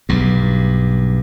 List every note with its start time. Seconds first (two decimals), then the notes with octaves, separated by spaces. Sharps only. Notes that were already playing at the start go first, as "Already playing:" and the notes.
0.09 B1 G2